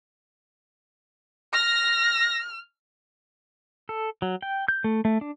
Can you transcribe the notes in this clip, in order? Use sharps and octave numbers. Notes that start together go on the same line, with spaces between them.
F6 A#6
A4
F#3
G5
G6
A3
A3
D4